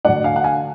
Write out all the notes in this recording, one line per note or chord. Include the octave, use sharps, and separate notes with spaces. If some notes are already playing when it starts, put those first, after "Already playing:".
D3 F#3 A3 D5 F#5
F5 G#5
F#5
F5 G#5